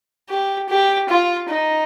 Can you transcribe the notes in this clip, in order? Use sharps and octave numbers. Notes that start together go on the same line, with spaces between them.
G4
G4
F4
D#4